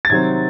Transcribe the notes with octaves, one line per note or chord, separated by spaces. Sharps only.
A6
C3 D#3 F#3 C4 G#6